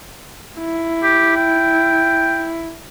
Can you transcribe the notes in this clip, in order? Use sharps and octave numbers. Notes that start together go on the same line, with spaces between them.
E4
G4
G5